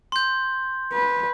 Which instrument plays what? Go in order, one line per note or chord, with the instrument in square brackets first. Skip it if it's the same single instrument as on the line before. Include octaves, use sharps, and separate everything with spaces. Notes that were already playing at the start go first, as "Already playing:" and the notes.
[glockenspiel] C6 G6
[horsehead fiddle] B4